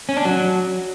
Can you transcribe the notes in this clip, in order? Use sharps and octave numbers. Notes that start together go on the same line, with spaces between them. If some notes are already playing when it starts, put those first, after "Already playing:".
C#4
D4
F#3